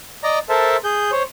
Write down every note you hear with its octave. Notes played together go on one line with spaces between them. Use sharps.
D5 D#5 A#5
A4 A#4 C5 E5 A5
G#4 G6
C5 C#5